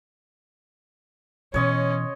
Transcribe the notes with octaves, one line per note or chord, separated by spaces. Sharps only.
B2 E3 C#4 C#5 D#5 C6